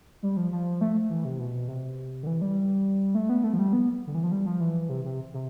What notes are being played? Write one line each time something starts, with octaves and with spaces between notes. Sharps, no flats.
G3
F3
F3
A3
E3
C3
B2
C3
D3
E3
G3
A3
B3
A3
F3
G3
B3
D3
E3
F3
G3
F3
E3
C3
C3
C3